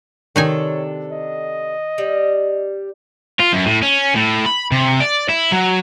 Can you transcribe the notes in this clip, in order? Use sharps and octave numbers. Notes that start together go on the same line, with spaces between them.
C3 D#3 D4 D#4 A4 C#5 G#5
D#5
G3
F4
F#2
A2
C#4
A2
B5
C3
D5
E4
F#3